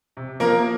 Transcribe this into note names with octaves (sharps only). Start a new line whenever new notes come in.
C3
F3 A#3 A#4